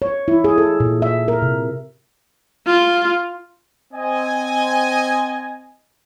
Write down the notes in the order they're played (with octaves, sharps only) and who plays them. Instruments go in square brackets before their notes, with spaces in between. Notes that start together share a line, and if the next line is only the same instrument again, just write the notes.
[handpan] C#5
E4
G#4
A4
A#2
E5
A#4
C3
[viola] F4
[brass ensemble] C4 D#5 G#5